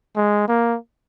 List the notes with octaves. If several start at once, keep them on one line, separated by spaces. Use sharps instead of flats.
G#3
A#3